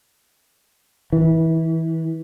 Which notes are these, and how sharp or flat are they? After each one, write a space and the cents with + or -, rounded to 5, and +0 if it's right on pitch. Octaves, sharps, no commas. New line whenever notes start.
E3 -25